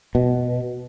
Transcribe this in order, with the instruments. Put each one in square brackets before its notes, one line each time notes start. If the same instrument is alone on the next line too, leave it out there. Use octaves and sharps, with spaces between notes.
[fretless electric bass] B2